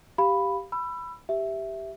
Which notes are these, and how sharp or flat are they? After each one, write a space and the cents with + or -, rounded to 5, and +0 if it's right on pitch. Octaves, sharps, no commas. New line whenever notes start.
G4 +0 F5 +0 B5 +0
B5 +0 E6 +25
G4 +0 E5 +0